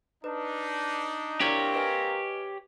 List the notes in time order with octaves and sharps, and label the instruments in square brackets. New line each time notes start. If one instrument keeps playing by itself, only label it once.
[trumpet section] D4 D#4 [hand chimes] B4
[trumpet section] A#3 C4 A#4 [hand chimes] D4 E4 D5 [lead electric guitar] G4 C#5
[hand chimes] B4 D#5 G#5